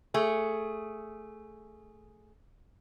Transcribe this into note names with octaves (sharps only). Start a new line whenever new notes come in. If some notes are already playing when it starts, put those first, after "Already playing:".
A3 G#4